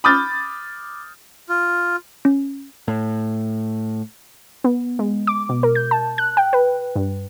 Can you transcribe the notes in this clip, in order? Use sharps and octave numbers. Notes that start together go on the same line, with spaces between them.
B5 D6 D#6 F6 G6 A6
F4
C#4
A2
B3
G#3
D6
B2
A#4
G6
A5
F#6
G5
B4
G2